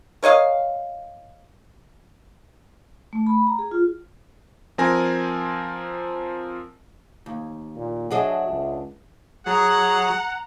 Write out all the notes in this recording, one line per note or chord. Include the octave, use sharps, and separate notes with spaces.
A#4 C#5 D#5 F5
A3
B5
A#5
G#4
F4
F3 C4 A#4 G#5 A#6
D#2
A#2
F#3 D4 G#4 D#5 E5 F#5
C#2
F#3 G#4 F#5 A#5